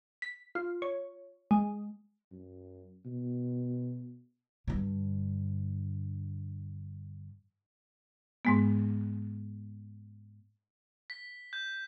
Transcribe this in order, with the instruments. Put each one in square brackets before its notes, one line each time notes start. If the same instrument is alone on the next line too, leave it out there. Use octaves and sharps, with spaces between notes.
[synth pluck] B6
F4
C#5
G#3
[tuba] F#2
B2
[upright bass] G2 D3
[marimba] G#2 G#3 B3
[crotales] B6
G6